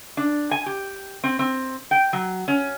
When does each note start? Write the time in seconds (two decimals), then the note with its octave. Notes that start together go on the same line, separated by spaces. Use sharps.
0.17 D4
0.51 G#5
0.66 G4
1.24 C4
1.39 C4
1.91 G5
2.13 F#3
2.48 C#4